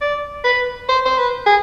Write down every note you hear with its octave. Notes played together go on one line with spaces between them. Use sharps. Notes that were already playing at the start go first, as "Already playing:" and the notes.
D5
B4
C5
C5
B4
G#4